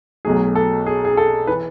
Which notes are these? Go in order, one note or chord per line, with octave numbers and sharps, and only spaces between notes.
B1 B2 F#3 A3 G#4
A4
G#4
G#4
A4
E3 B4